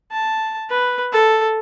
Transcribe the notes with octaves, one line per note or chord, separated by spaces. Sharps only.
A5
B4
A4